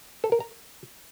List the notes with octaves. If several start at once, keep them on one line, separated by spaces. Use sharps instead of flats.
A4
A#4
A#5